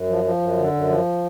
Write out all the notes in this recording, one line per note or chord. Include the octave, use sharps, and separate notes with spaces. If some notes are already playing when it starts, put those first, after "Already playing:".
Already playing: F#2
F3
F3
F#2
D3
F#2
F3